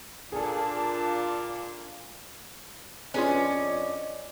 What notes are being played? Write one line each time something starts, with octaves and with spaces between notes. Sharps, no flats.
A#2 D4 G#4 A4
F2 C#4 D4 F4 G#4 B4 D5 D#5